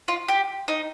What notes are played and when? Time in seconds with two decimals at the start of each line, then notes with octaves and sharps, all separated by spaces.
0.08 F4
0.28 G4
0.68 D#4